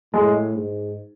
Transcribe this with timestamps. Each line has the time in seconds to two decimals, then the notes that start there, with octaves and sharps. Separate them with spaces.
0.13 A2 G#3
0.55 G#2